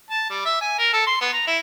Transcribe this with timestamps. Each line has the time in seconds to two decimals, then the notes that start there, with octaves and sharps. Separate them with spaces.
0.11 A5
0.30 G3
0.45 E5
0.61 G#5
0.78 A#4
0.93 A4
1.07 C6
1.21 B3
1.33 A#5
1.47 E4